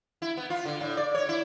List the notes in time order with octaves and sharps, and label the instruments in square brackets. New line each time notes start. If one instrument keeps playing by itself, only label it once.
[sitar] E4
B3
F4
D3
A2
D5
C#5
E4